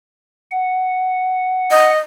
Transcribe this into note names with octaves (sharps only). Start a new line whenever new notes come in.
F#5
D#5